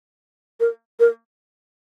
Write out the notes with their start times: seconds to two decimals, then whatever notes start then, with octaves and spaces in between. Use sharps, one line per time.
0.60 A#4
1.00 A#4